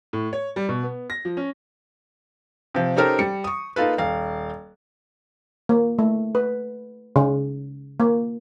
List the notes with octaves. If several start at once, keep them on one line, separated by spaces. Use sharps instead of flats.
A2
C#5
G3
B2
B3
A#6
F3
C#4
C3 F3
C#4 D#4 G4 A4 A#4 C5
G3 C#7
C#6 D#6
A#3 D#4 F4 A4 B4
D#1 F5
A#3
A3
B4
C#3
A#3